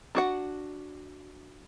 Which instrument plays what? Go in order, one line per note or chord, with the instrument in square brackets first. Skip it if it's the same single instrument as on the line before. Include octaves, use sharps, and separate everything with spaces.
[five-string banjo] D4 F#4 F#5